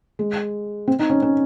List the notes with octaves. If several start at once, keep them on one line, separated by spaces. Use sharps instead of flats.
G#3
C4
D#4
C#4
C#4